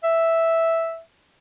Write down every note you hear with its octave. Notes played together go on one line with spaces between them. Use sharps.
E5